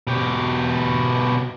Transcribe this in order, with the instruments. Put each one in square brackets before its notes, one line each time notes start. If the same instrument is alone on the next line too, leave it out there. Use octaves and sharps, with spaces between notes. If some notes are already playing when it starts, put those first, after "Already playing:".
[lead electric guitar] B2 G4